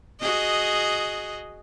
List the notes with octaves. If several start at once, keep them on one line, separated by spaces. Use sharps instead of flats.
F#4 G#4 D#5